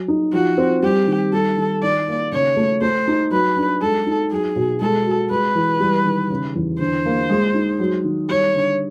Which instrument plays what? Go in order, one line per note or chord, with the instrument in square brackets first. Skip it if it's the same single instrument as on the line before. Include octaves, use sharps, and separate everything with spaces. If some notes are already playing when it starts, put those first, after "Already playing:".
Already playing: [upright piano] F#3
D#4
[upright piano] F3 [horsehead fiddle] F#4
[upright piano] C4
[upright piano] G3 [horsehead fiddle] G4
[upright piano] D#3
[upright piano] G3 [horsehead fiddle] A4
[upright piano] D#3
[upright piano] D#3 [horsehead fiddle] D5
[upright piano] A#3
[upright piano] C#3 [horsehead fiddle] C#5
[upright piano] A3
[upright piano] A3 [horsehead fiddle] C5
[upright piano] D#4
[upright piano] F#3 [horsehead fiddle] B4
[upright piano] D4
[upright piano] G#3 [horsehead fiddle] A4
[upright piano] D#4
[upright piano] F#3 [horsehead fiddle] G#4
[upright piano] B2
[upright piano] G#3 [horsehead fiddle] A4
[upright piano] F#4
[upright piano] G#3 [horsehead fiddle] B4
[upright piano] E3
G3
D#3
C#3
E2
[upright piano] D3 [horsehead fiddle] C5
[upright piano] A#3
G#3
D#4
F#3
D#3
[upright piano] G3 [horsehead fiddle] C#5
[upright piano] D3